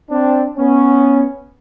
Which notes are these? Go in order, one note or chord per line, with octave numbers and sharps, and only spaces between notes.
C4 D4
B3 C#4